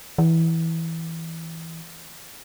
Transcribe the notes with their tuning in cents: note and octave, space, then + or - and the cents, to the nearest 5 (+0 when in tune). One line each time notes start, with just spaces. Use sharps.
E3 -10